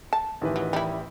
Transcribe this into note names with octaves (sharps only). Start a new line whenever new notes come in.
A5
A1 D#3 E3 G4 B4
F#3
G3 E4